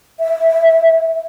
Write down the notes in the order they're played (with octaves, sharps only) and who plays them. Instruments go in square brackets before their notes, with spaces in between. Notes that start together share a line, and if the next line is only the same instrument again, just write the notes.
[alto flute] E5